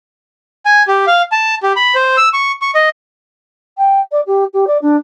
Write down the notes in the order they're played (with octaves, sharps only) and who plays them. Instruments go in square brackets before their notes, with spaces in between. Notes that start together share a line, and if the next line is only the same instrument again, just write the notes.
[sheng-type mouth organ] G#5
G4
F5
A5
G4
B5
C5
E6
C#6
C#6
D#5
[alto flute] G5
D5
G4
G4
D5
D4